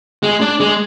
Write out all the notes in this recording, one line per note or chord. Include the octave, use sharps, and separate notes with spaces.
G#3
D4
G#3